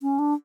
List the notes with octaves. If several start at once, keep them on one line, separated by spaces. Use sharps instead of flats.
C#4
D4